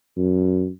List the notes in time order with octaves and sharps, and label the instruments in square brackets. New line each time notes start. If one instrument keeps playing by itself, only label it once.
[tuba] F#2